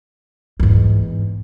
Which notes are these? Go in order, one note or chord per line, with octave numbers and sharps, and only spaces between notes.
E2 G#2